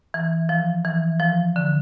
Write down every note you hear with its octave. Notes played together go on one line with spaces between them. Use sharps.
E3
F3
E3
F3
D3